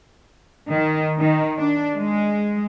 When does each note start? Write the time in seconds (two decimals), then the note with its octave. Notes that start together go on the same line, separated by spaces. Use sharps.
0.71 D#3
1.18 D#3
1.57 D4
1.96 G#3